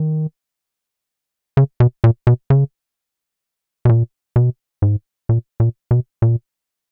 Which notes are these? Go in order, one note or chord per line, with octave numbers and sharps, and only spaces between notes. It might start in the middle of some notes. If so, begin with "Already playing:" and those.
Already playing: D#3
C#3
B2
A#2
B2
C#3
B2
A#2
B2
G#2
A#2
A#2
B2
A#2